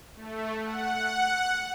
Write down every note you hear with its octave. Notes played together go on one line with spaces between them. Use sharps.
A3
F#5